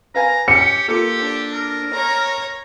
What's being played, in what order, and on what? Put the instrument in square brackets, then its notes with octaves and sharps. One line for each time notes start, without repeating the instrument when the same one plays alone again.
[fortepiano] B4 F5 G#5 [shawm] A#5
[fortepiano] C#4 [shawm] G4 [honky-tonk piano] C#7
[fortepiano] A#3 F4 A4 [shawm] G4
[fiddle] D4
[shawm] A#4
[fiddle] C#5 A#5